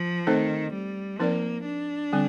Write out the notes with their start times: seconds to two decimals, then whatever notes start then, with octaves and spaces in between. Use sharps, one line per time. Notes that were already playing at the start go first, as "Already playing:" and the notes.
Already playing: F3
0.27 D#3 A3 C4 D#4 A4 C5
0.73 G3
1.19 F3 A#3 C4 D#4 A#4 D5
1.65 D4
2.13 D3 G3 C4